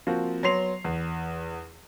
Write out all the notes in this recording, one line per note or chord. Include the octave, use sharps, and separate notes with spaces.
F3 A#3 C4 F#4
F#3 B3 C6 C7 F7
E2